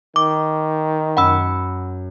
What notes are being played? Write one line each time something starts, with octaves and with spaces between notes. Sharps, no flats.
D#3 D6
F#2 F#5 B5 E6 C#7